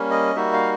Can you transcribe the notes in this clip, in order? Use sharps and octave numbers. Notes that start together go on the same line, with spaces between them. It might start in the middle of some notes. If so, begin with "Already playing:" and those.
Already playing: G3 A#3 C#4
D#5
G3 A#3 D#4 F#4 E5
F5